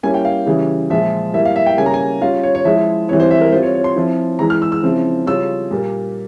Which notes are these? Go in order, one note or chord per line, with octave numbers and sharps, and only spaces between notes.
G3 A#3 C#4 E4 G#5
G5
F5
C#3 E3 G3
A#2 F3 G#3 E5
G3 A#3 E4 E5
F5
E5
G5
C#3 G3 A#3 C#4 G#5
A#5
G#5
G3 C#4 F4 F5
C#5
C#5
F3 G#3 E4 E5
E3 G3 C4 E4 C#5
C5
E5
A#4
G3 C4 F4 C5
C#5
C#5
C6
F3 C4 E4
E3 G#3 E4 A#5
F6
E6
E6
C#3 F3 C4 E4
C#3 G3 C#4 F4 E6
A#2 G3 A#3